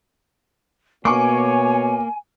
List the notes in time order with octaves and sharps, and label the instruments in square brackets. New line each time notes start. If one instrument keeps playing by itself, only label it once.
[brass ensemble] B2 C#5 [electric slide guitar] A#3 [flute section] G#5 [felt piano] C#6 D6